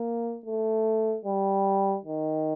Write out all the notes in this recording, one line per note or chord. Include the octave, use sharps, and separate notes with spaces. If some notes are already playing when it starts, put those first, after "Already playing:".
Already playing: A#3
A3
G3
D#3